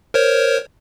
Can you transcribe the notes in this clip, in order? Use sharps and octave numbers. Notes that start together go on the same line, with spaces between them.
A#4 C5 C#5